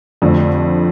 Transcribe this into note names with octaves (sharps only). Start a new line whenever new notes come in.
F2 D3 F3 A3 D4